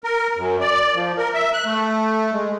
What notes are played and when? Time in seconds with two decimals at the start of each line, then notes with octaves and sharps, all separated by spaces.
0.04 A#4
0.37 F#2
0.61 D5
0.95 F3
1.17 A#4
1.34 E5
1.53 F#6
1.66 A3
2.33 G#3